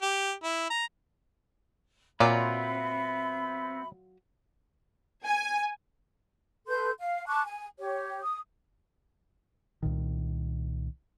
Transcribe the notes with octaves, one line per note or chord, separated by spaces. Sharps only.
G4
E4
A#5
A#2 F#3 B3 C4 F4 D5 E5 B5
G#5
A4 B4 C6 G6
F5
A5 C#6 D6 F#6
G#5
G4 C#5
D#6
C2 A#2 D#3